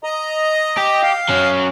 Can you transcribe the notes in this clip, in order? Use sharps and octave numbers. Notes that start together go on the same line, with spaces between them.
D#5 A#5
G4
F5
F#3 C#4